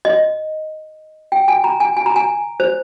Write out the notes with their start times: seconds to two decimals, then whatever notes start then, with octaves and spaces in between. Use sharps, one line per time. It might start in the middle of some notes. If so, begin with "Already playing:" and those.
0.05 D#5
1.32 G5
1.48 G#5
1.64 A#5
1.80 G#5
1.97 G#5
2.06 A#5
2.16 G#5
2.60 C5